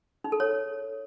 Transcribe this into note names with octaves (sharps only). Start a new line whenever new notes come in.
D#4
A4
C#5